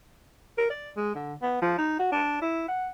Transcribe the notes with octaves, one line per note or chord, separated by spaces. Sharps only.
A#4
D5
G#3
D3
B3
F3
D#4
F#4
D4
E4
F#5